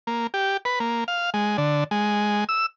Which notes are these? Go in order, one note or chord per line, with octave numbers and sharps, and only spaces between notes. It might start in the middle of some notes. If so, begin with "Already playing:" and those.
A#3
G4
B4
A#3
F5
G#3
D3
G#3
E6